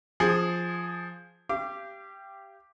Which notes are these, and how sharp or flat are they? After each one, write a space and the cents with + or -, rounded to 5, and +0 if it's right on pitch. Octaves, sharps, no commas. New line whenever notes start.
F3 +0 G#4 +0
G4 +0 F5 -40 D6 +0